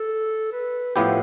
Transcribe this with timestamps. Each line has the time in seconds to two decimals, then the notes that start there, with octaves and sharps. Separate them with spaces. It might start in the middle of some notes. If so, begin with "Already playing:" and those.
Already playing: A4
0.52 B4
0.95 A2 F3 B3 E4 G4 C5